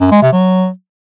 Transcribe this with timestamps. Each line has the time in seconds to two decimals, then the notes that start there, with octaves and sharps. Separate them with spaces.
0.01 F#2
0.11 G#3
0.22 C3
0.32 F#3